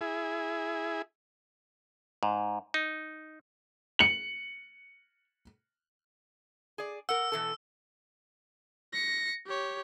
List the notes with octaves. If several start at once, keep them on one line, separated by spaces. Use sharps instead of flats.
E4 G#4
G#2
D#4
C#7 F#7
G#4 D5
A#4 F#5 E6
B2 E3 A4
A#6 C#7
G4 C#5